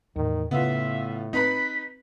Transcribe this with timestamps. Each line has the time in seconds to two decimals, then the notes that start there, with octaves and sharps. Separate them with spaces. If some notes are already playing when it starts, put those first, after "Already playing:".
0.16 E2 A2 D#3
0.51 A2 C#3 B3 F4 E5
1.33 C4 D#4 B4 B5 B6